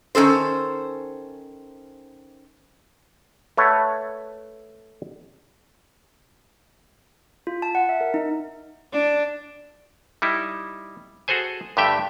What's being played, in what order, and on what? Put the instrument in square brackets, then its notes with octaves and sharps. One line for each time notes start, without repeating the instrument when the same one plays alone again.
[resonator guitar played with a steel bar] D#3 E3 C#4 A4 C5
[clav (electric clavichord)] A3 B4 C#5 F#5
[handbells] F4
A5
F#5
E5
A#4
D#4
[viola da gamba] D4
[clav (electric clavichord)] G3 D#4 E4
F#4 G#4 A4 C5 G#5
G2 D3 A3 G4 E5 G5